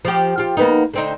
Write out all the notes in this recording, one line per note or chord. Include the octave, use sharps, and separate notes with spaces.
F3 G4
F4 G4
A#3 B3 D#4
D3 C4 D#4